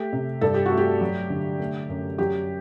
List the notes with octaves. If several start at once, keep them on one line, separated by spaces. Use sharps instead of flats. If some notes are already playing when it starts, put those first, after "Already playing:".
Already playing: A3 G4
C3
G2 A4
G4
F#4
A3
G4
F#3
D3
A3
F#2
F#3 G4